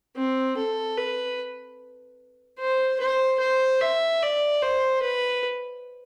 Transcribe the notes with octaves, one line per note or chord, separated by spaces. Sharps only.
C4
A4
B4
C5
C5
C5
E5
D5
C5
B4